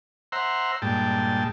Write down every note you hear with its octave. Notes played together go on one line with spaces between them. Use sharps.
C5 E5 F#5 A#5 C6
G2 A#2 G#3 G5 A5